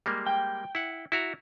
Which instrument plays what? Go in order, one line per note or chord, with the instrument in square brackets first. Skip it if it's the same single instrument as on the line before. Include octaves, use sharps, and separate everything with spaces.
[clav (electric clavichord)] G3 G#3 A#3
[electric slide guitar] G5
[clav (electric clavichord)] E4 F#5
E4 F#4 A#5